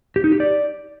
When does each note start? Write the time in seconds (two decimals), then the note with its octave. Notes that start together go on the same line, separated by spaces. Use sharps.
0.16 G4
0.24 D#4
0.32 G4
0.40 D5